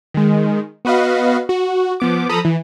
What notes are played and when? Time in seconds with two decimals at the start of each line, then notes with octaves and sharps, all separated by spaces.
0.14 D#3 G#3
0.85 B3 F#4 B4 D#5 F5
1.49 F#4
2.00 F3 B3 D6
2.29 F3 A4 A#5 B5 D#6
2.45 E3